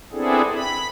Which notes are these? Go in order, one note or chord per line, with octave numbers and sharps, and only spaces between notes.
B3 C4 D4 E4 G#4 A4
B5